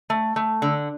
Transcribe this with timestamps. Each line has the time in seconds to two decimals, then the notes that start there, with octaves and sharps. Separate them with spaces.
0.10 A3
0.36 A3
0.62 D3